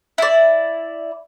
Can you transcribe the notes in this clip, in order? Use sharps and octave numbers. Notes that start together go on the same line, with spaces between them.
E4 D5